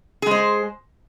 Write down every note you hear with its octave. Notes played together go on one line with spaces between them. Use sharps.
G#3 G#4 C5